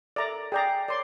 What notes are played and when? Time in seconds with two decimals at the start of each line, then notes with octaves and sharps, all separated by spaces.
0.16 A4 A#4 D5 E5 A#5
0.52 G#4 D5 G5 A#5 G6 C7
0.88 A#4 C#5 D5 C6 D6